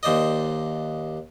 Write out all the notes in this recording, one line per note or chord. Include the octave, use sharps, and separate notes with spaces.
D#2 C5 D5 D#5